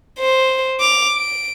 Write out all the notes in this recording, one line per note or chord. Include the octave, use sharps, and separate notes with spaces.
C5
D6 F7
D7